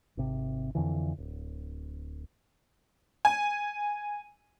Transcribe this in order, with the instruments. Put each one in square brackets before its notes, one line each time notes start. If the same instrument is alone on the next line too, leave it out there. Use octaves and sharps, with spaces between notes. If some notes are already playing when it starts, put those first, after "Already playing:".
[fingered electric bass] G#1 C3
F2 D3 E3
D1
[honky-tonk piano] G#5